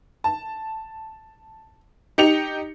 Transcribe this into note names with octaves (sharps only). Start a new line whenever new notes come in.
A5
D#4 G4 C#7 F7